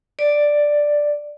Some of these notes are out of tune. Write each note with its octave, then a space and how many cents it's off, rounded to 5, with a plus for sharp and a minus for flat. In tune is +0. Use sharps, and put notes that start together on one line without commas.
D5 +5